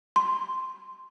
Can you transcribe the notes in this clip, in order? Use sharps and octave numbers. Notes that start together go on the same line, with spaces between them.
C6